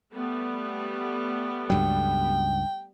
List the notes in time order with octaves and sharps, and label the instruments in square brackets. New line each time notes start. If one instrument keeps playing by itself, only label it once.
[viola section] G3 A3 B3
[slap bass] C#2 G2 F#3 [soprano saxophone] G5